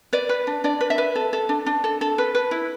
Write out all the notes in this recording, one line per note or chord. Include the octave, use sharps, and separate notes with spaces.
B4 D5
B4
D4
D4 D5
B4
E5
B4
A4
A4
D4
D4
A4
A4
B4
B4
E4